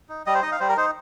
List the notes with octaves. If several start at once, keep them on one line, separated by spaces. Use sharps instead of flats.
D#4
G3 D#5
C5
D#4 D#5
F5
G3 C5
A#4
D#4 C5